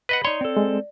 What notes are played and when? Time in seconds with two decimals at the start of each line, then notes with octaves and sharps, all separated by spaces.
0.09 B4 D#5 F#5 B5
0.25 D#4 C#5 D5 C6
0.41 C4 A4
0.57 G#3